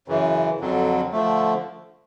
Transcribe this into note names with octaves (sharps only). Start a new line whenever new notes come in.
F#2 C#3 E3
F2 D3 F#3
D3 F3 A3